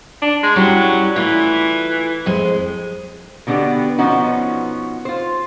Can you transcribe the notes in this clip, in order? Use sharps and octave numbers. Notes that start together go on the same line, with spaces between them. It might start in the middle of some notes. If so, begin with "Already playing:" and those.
D4
G#3
F#3 G3 C#4 E4
E3 A3 F4
F2 G#3
B2 D3 B3 D4 G4
B2 F3 B3 C#4 D#4 F#4
F4 C5